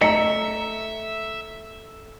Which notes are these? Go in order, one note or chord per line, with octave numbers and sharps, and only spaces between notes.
A3 D#5 E5 A#5 C#7